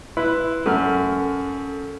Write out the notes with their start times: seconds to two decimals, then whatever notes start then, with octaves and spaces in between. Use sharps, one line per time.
0.17 E4 B4 E5 C6
0.66 F#2 A4 F6